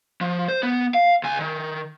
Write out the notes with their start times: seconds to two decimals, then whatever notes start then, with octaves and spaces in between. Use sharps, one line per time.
0.21 F3
0.48 C5
0.63 B3
0.94 F5
1.23 C#2 G#5
1.40 D#3